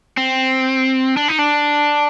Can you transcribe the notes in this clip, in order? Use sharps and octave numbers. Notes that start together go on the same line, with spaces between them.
C4
D4
D#4
D4